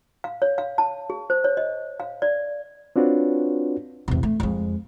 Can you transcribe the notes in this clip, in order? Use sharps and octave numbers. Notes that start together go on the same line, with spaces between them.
F5
C#5
F5
A5
G#4
C5
C#5
D#5
F5
D5
C4 D4 F4 F#4 B4 C#5
E2 C3
A3
F2 G#3